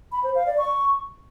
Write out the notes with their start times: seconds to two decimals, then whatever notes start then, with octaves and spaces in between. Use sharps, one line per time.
0.12 B5
0.23 C5
0.35 F5
0.46 D5
0.58 C#6